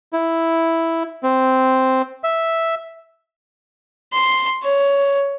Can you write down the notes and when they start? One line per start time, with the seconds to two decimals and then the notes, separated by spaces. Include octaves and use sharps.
0.13 E4
1.23 C4
2.24 E5
4.13 C6
4.63 C#5